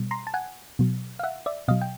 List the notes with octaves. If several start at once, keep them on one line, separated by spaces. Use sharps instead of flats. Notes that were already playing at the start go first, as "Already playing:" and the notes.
Already playing: B2 G3
A#5 C6
A5
F#5 G#5
B2 F#3
F5
E5 F#5
D5 E5
B2 F#3 D#5 F5
G5